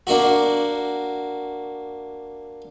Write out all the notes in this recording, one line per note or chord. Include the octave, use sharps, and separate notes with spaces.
A#3 D4 F#4